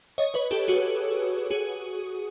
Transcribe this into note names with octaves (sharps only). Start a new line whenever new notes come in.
C#5 D#5
B4 C#5
G4 A4
F#4 G#4
F#4 G#4